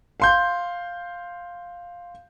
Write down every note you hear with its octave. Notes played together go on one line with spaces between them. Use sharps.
F5 C6 G6